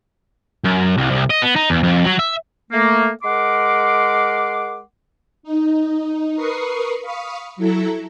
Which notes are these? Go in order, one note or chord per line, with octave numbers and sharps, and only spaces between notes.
F#2
C2
C2
D#5
B3
D#4
E2
F2
F#3
E5
A3 A#3
G#3 A#4 F#5 C6 D6
D#4
A#4 B4 C#6 D#6 C7
F5 B5 C#6 D#6
F#3 E4 A4 A#5